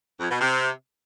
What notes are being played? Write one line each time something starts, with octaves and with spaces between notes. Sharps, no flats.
F2
B2
C3